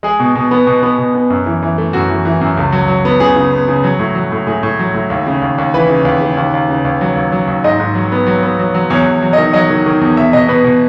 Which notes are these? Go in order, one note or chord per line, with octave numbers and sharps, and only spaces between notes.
G#3 G#4
B2
B2
B3
B2
B3
B2
B3
F#2
E3
E3
A3
F#2 F#4
E3
E3
F#2
C#2
F#3
F#3
B3
C#3 G#4
C#3
B3
C#3
F#3
A2
F#3
A2
A2 G#4
A2
F#3
A2
D#2
C#3
D#2
D#2
E3 B4
C#3
D#2
C#3
D#2
D#2
C#3
D#2
F#3
D#2
F#3
D#2
G#2 D#5
G#2
F#3
B3
F#3
B3
F#3
F#3
E2 C#5
E2
F#3
D#3 D#5
F#3 D#5
D#3
D#3
E2
B2 E5
B2 D#5
B2 B4
B2